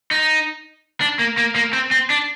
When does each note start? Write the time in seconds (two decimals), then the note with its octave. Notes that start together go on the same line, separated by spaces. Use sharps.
0.11 D#4
1.01 D4
1.19 A#3
1.37 A#3
1.56 A#3
1.73 C4
1.91 C4
2.10 D4